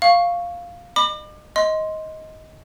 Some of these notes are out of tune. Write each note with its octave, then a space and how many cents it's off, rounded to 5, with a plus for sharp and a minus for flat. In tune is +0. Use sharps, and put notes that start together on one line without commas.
F5 +0 C#6 +0
D#5 -35 B5 +0 D6 +35
D#5 +15 C6 +0